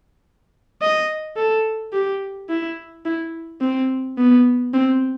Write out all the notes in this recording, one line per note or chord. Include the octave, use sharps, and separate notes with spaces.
D#5
A4
G4
E4
E4
C4
B3
C4